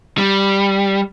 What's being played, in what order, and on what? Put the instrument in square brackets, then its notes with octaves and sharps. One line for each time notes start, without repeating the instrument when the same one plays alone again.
[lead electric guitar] G3